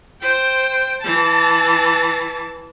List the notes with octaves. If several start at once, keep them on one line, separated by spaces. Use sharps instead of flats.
C5 G5
E3 A5